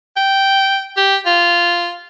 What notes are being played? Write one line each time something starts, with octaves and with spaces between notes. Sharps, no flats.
G5
G4
F4